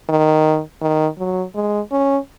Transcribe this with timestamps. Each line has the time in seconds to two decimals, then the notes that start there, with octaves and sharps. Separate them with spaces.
0.09 D#3
0.81 D#3
1.19 F#3
1.55 G#3
1.92 C#4